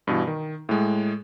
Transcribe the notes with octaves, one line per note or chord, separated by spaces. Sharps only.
G2 B2 E3
D#3
A2 G#3